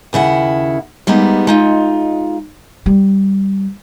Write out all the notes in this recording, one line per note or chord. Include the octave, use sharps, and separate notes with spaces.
D#2 C#3 E4 F#5
G3 G#3 A#3 B3 D#4
G#3 D#4 F4
G3